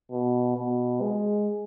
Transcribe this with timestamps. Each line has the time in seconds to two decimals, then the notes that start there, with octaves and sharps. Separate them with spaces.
0.11 B2
0.56 B2
1.01 G#3